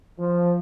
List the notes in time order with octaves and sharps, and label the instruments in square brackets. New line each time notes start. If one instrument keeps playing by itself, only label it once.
[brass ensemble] F3